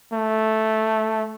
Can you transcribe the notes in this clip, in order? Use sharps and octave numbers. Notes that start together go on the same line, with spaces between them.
A3